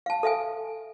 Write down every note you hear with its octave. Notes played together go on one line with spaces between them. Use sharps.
F5 A5
A4 E5 F5 G#5